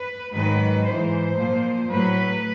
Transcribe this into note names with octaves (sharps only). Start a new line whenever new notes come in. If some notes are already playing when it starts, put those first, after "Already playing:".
Already playing: B4
G#2 D#3 F#3 B4
G#2 E3 C5
A#2 F3
A2 F#3 B4